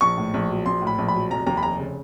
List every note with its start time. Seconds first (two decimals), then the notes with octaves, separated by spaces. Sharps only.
0.01 A#1 C#6
0.18 A2
0.34 A#1
0.50 F#3
0.66 A#1 C6
0.82 A2
0.87 B5
0.98 A#1
1.08 B5
1.14 F#3
1.30 F1 A#5
1.47 D#2 A#5
1.57 B5
1.62 F1 A#5
1.79 C#3